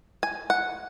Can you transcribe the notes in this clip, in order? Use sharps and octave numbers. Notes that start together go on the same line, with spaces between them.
G#5
F#5